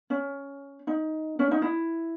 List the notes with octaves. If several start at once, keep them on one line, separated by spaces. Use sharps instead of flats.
C#4
D#4
C#4
D#4
E4